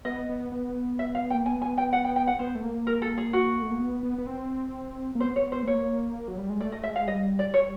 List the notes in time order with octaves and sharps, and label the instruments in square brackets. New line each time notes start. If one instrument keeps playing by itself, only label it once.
[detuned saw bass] B3 [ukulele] D#5
[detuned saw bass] B3
B3
[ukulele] E5
F5
G5
[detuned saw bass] A#3
[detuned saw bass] B3 [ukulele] G#5
[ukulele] G#5
G5
F#5
G5
G5
F#5
[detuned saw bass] B3 [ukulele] C5
[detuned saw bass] A3
A#3
[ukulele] A#4
A4
G#4
F#4
[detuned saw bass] A3
A#3
B3
B3
B3
C4
A#3
[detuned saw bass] B3 [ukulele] C5
[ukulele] C#5
C5
[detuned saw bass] A3
[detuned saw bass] A#3 [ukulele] C#5
[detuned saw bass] F#3
G3
G#3
[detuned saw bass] A3 [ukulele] D5
[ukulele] D#5
[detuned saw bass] G#3 [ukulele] E5
[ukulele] F5
[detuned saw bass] G3 [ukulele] D#5
[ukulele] D5
C#5